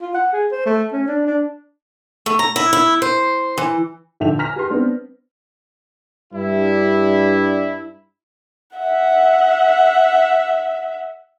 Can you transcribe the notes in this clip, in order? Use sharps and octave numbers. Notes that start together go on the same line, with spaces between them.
F4
F#5
G#4
C5
A3
C#4
D4
D4
A3
A#5
E4
E4
C5
E3
A#1 D3 E5 G5 F7
G#5 A#5 F6 A#6 B6 F7
G4 B4 C6
B3 C4 D4
G2 G3 D4 E4
E5 F#5